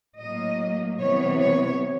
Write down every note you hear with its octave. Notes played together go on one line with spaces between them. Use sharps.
A2 F#3 A#3 D#5
C3 E3 G3 B3 C#5
C#5